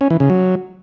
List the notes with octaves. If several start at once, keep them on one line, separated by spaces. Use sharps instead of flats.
C#4
E3
C#3
F#3